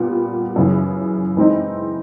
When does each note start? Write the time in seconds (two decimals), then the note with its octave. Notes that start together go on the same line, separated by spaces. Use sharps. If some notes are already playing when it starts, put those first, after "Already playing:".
Already playing: A#2 G3 B3
0.56 F#2 C#3 E3
1.37 E3 G#3 C4 D#4